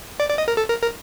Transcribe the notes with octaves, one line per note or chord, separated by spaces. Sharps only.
D5
D5
D#5
A#4
A4
A#4
A#4